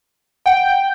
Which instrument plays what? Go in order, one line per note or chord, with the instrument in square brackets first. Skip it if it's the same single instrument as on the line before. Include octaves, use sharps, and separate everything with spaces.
[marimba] F#5 [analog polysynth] G5